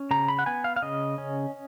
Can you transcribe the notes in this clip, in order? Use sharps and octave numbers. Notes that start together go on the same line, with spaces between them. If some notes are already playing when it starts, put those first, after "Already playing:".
Already playing: C#4
C#3 A#5
B5
F#5
B3 G#5
F5
F5
C#3 D#5
C#4